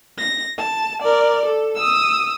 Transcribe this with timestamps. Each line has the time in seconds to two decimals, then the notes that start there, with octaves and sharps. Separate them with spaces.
0.18 A#6
0.58 A5
1.02 A#4 D5
1.46 A4
1.75 D#6 E6